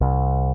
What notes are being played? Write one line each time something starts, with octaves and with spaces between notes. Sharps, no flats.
C2